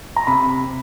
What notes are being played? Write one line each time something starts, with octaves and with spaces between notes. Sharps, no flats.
A#5
C3 B5